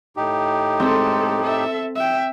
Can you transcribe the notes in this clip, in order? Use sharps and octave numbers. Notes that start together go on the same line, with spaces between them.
A2 D#4 G4
G#3 C4 A4
A4 E5
E5 G5